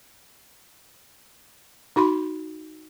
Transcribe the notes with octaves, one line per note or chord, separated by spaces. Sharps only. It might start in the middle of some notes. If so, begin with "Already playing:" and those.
D#4 F#4 B5 C6